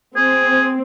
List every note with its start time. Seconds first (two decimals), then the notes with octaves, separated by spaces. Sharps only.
0.17 C4 G#4